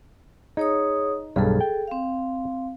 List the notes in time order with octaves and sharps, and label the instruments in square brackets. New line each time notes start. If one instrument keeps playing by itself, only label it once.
[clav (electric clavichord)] D#4 [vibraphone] G#4 C#5 D#6
[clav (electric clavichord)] B1 G2 F5 [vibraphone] G#4 A4
[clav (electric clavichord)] G5
[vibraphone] C4 F5